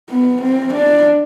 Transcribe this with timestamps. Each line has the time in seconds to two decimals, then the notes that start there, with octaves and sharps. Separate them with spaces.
0.10 B3
0.42 C4
0.74 D4